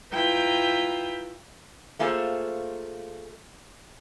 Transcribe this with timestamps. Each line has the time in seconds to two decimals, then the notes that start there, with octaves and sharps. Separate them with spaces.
0.12 E4 F4 B4 G5 A#5 G6
1.99 A3 A#3 F4 G#4 A4 C5